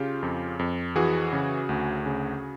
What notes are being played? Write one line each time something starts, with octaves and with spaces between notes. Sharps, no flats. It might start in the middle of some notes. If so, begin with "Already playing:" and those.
Already playing: C#3 F4 G4
F2
F2
E3 F#4 G#4
C#3
D2
C#3